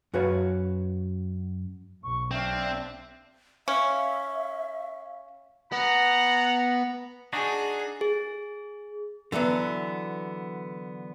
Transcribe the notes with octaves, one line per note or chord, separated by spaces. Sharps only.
F#2 F#4 B4 C#5 F5
B1 C#6
C4 D4 D5 E5 F5
C#4 E5 F5
B3 F#5 A#5
D4 D#4 F#4 G#4
G#4
D3 E3 F#3 B3